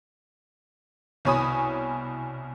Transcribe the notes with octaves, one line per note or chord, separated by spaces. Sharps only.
C2 B2 C#5 G#5 B5 D#6